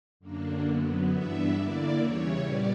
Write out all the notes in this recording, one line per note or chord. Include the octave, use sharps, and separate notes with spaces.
F#2 D3 A#3 D4
F#2 D3 F#3 B3
G2 E3 B3 D4 E5
D3 A#3 E4 D5
E2 C#3 E3 G3 C#5
A#2 G3 B3 D5